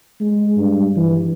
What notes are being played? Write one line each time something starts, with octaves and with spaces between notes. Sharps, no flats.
G#3
G2
E3